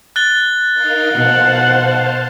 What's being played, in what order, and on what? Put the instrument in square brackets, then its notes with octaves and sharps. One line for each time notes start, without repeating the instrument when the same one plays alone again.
[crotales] F#6 A6 G7
[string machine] D#4 A#4 F5
[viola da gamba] B2 [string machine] C5 F5 A5 [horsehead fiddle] F#5